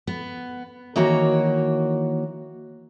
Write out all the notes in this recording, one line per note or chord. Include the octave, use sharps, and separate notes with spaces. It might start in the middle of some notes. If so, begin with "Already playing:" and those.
B3
D#3 E3 A#3 F#4 C#5 A#5